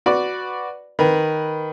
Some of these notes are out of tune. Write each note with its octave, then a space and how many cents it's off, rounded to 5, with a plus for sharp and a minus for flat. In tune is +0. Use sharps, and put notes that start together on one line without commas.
F#4 +0 B4 +0 D5 +0
D#3 +0 B4 -5